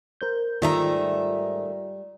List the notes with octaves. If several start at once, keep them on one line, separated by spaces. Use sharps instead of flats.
A#4 C5 G6
G#2 D#3 G3 A3 F4 E5 A#5